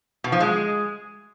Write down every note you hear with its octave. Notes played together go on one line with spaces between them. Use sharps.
B2
F3
G#3